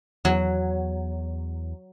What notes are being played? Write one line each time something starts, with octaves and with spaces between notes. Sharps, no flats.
E2 F#3